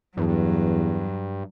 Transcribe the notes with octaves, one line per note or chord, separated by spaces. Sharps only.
E2 G2 F#3